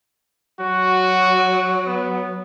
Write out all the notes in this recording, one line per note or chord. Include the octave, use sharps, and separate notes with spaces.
F#3 F#4
B3